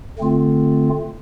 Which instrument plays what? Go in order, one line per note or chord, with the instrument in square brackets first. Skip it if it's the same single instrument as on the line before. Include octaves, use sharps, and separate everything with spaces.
[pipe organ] D3 A3 C4 F4